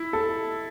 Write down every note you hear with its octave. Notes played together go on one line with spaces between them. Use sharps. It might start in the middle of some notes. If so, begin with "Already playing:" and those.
Already playing: E4
A4